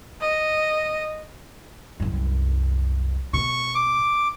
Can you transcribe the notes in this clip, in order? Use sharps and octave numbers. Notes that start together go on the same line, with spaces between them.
D#5
C2 F#2
B2 C#6
D6